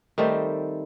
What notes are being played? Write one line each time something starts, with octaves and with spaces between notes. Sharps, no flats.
D#3 G3 A3 C4